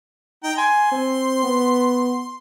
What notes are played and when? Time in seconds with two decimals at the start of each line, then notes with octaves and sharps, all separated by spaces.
0.43 D#4 G5 A#5
0.57 G#5 C6
0.92 C4
1.43 B3